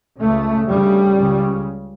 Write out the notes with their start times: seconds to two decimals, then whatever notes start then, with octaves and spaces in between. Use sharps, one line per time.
0.20 C#2 C#3 A3
0.69 D2 C#3 G3
1.19 C#2 C#3